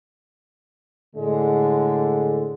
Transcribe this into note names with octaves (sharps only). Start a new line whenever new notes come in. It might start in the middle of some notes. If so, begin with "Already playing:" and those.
A2 D3 G#3